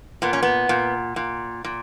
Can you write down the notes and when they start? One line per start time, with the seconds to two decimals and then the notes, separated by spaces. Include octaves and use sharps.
0.22 A#2 B3
0.33 C#4
0.42 B3
0.69 A#2
1.16 A#2
1.65 A#2